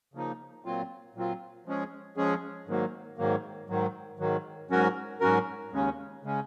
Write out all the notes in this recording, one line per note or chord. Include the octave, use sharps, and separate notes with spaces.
C#3 F3 A#3 D#4
A#2 F#3 C4 F4
A#2 F#3 C4 F4
F3 G#3 C#4 G#4
F3 G#3 C#4 G#4
G#2 D#3 F#3 A#3
G#2 D#3 F#3 A#3
G#2 D#3 F#3
G#2 D#3 F#3
G#2 F#3 C#4 F#4 A#4
G#2 F#3 C#4 F#4 A#4
D#2 C#3 G#3 C#4
C#3 G#3 C#4